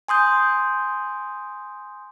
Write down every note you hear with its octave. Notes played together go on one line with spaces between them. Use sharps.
G#5 C6 D#6 G6